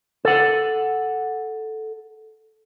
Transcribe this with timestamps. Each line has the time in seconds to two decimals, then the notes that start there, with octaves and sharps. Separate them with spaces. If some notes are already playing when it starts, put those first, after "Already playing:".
0.25 A4 F#5